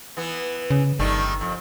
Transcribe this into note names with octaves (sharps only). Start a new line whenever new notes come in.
E3 B3
C#3
G1 D#3 G3 A3
F2